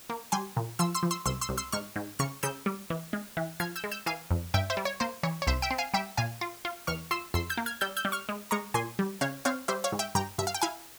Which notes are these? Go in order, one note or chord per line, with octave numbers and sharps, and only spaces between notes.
A#3
G3 G#5 C6
A#2
F3 C6 E6
C6 E6
F3
C6 E6
C2 C6 E6
C6 E6
C2
C6 E6
G#2 C#6 F6
G#2
C#3 C#6 F6
C#3 E6 G6
G3
E3
G#3
E3
F3 F6 G#6
E6 G6
G#3
E6 G6
E3 F5 G#5
F2
G2 E5 G5
C5 E5
G3
C#5
A#3 C5
E3 C#5
C#5
C2 C5 E5
E5 G5
C4
F5 G#5
G3 E5 G5
A#2 F5 G#5
F4
F4
E2 C#6 F6
F4 C6 E6
F2 C6 E6
E6 G6
A#3
F6 G#6
G3 E6 G6
E6 G6
G3
C#6 F6
G#3
G#3 A#5 C#6
A#2 G#5 C6
G3
C#3 C#5 F5
C4 C#5 F5
G3 C5 E5
C#5 F5
G#2
E5 G5
G2 G5 A#5
G2 E5
F5
G5
E4 F5 G#5